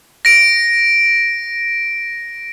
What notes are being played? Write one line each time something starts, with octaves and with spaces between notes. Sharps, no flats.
A#6 D7